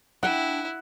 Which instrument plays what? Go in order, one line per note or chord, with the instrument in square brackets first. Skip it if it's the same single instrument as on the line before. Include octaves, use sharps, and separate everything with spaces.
[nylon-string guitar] D4 G5 [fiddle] E4 [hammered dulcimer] F#5